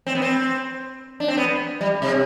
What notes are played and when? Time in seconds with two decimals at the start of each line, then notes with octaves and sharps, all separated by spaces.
0.06 C4
0.15 B3
0.22 C4
1.20 D4
1.28 C4
1.38 B3
1.81 G3
2.02 C3